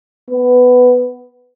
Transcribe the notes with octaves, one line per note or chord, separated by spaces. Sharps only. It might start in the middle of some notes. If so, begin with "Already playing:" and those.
B3